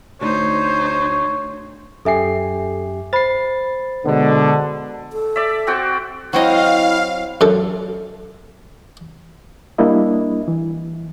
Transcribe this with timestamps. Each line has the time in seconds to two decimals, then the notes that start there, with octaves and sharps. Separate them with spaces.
0.21 D2 D#4 C5 C#5
2.05 F#2 G4 A4 E5 G#5 C7
3.13 C5 B5 A6 C7
4.05 B2 D3 G#3 B3
5.13 A4
5.36 D5 E5
5.67 C4 F#4 G5
6.33 F#3 C4 E4 D#5 F5
7.41 F#2 A4
9.78 G3 A#3 D4 E4 D#5
10.48 E3